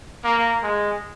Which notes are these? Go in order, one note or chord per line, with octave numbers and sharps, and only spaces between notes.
A#3
G#3